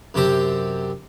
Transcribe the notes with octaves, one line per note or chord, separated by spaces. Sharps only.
F#2 C3 C4 G4 C5 A5